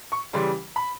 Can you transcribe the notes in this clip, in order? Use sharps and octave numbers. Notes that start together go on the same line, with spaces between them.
C#6
C#3 E3 G3 C6
B5